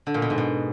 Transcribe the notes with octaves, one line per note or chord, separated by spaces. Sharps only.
D3
A#2
B2
G#2
B2